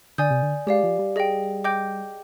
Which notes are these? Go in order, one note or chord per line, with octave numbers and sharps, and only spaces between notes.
D3 D5 G#5 D#6 G6
C3
D3
G#3 G4 D5 F5
F3
G3
G#4 D#5 G5
D#5 G5 D6 G6